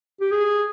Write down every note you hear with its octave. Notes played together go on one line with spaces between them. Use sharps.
G4
G#4